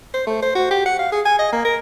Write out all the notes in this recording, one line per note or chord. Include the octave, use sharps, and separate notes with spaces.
C5
A3
C5
F#4
G4
F#5
F5
G#4
G#5
D#5
A#3
A#4